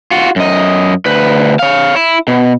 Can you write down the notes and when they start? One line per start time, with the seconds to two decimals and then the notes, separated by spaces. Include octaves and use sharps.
0.11 F4 F#4
0.36 F#2 D#5
1.06 D2 B4
1.59 C#5 F5
1.96 E4
2.28 B2